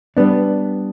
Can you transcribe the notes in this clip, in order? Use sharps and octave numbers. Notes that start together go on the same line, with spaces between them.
G3 B3 D4